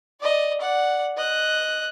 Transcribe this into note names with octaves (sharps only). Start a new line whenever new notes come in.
D5 D#5
D5 F#5
D#5 F#6